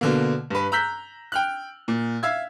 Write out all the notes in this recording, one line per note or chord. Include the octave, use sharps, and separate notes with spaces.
B2 D3 A#3
G2 B4
A#5 E6 F#6 G6 B6
G5 F6 F#6
A#2
E5 F5 E6 G#6